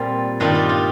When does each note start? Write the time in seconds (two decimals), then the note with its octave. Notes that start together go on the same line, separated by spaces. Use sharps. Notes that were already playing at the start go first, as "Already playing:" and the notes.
Already playing: A#2 G3 C4 F4
0.40 G2 D#3 G3 F4
0.55 G4
0.69 F4